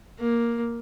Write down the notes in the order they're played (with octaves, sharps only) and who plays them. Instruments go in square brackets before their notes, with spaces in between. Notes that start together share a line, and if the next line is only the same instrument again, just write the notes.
[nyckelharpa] A#3